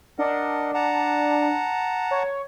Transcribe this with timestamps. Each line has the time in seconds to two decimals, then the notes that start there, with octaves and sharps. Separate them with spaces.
0.19 D4 A#4 D#5 F#5
0.74 F#5 A5 A#5
2.11 C#5